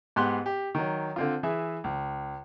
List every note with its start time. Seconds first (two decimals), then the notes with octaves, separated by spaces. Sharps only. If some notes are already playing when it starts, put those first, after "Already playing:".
0.16 G#2 B3 G4 C6 F#6
0.46 G4
0.75 D#3 F#3
1.16 D3 C4 F4
1.43 E3 G#4 E5
1.84 C#2